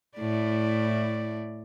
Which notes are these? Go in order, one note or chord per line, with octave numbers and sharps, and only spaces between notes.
A2 E4 D5